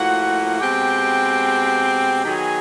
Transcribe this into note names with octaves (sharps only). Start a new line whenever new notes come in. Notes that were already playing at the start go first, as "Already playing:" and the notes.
Already playing: A2 F3 A#3 F#4 F#5
B2 G#3 C4 G4 G5
D#3 F#3 B3 G#4 G#5